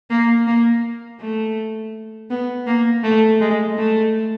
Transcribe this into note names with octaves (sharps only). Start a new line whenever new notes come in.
A#3
A#3
A3
B3
A#3
A3
G#3
A3